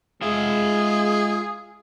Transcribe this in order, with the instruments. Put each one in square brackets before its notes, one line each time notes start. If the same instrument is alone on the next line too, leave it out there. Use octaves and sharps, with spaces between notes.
[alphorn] G#3 [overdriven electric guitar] F4 E5 [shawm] G#4